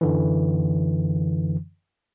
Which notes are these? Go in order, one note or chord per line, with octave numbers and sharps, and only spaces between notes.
F#2 D3 E3